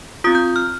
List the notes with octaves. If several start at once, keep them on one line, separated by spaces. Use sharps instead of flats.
C4 F4 D#6
G6
F6